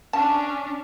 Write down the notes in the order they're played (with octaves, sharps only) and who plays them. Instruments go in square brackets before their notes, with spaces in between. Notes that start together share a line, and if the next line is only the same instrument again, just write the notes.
[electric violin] C#4 D4 [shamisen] A5